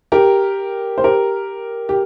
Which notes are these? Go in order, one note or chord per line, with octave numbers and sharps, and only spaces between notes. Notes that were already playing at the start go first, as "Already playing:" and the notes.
G4 A#4
C5
G4 A#4
G4